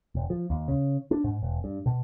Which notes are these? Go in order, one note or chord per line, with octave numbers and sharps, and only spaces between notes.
E1
F3
D#2
C#3
D4
G#2
E1
G2
B2